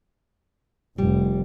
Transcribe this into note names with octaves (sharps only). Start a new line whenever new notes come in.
F1 G3